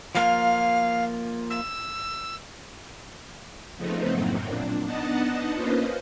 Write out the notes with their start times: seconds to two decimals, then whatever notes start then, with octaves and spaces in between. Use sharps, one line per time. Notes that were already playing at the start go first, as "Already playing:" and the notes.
0.15 F3 A#3 F4 F5
1.50 E6
3.77 C#3 F3 A3 B3 C4 D#4
4.12 F#2 A2 F#3 A#3 C4
4.45 A#2 D4
4.85 B3 D4 D#4 D#5 F#5 A5
5.54 A#3 C#4 F4 B4 C5 D#5